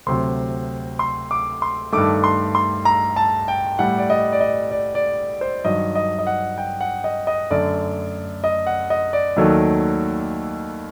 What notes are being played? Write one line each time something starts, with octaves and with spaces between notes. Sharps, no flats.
D2 C3 F#3 C6
C6
D6
C6
G2 D#3 A3 D6
C6
C6
A#5
A5
G5
A2 G3 F#5
D5
D#5
D5
D#5
D5
D5
C5
G2 D#3 F#3 D#5
D#5
D#5
F#5
G5
F#5
D#5
D#5
F#2 D3 A3 D5
D#5
F#5
D#5
D5
D#2 D#3 F#3 A3